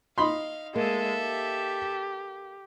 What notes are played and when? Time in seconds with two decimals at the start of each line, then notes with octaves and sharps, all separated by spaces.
0.18 D#4 F5 B5 C6
0.76 G#3 A#3 A4 E5
1.20 G4